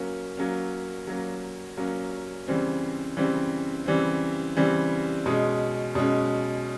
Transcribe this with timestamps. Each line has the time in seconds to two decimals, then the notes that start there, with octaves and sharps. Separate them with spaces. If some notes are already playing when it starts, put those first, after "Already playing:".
Already playing: F#3 A#3 C#4
0.38 F#3 A#3 C#4
1.07 F#3 A#3 C#4
1.77 F#3 A#3 C#4
2.48 C#3 E3 G3 C4
3.17 C#3 E3 G3 C4
3.86 C#3 E3 G3 C4
4.57 C#3 E3 G3 C4
5.26 B2 G#3 C#4
5.95 B2 G#3 C#4